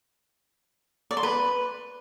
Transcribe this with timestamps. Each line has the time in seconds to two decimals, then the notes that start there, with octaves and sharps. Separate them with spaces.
1.11 D5
1.17 C6
1.23 B4